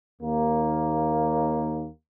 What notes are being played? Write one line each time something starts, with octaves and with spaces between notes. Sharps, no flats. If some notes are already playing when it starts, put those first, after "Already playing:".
D#2 A#3